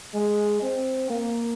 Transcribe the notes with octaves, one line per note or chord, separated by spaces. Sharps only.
G#3
C4
A#3